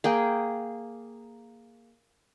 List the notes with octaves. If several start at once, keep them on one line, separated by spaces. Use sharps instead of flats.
A#3 G#4 G5